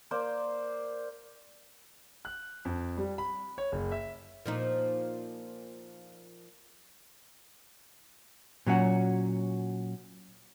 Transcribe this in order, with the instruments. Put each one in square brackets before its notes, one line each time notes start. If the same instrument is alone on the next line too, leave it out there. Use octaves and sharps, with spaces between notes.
[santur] A#3 C5 D5
[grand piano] F#6
F2
G3
B5
C#5
F#1
E5
[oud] A#2 F3 D#4
[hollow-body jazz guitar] A#2 F#3 C#4 F#4